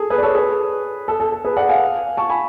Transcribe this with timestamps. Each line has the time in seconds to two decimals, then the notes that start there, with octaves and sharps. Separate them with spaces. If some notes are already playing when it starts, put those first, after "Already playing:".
Already playing: G#4 A4
0.10 G#4 B4
0.18 D5
0.23 A4 C#5
0.35 G#4 B4
1.08 A4
1.20 A4
1.32 A4
1.44 G#4 B4
1.57 D5 F#5
1.69 F5 G#5
2.17 A5 C#6
2.30 G#5 B5